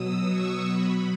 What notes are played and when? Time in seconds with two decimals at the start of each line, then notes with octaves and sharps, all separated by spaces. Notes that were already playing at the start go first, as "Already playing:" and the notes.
Already playing: B2 F#3 D#6 E6
0.28 C#6
0.67 B2 F#3 B5